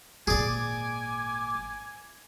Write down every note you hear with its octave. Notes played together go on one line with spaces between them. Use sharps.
G#1 A#2 G#4 D5 G#5 D6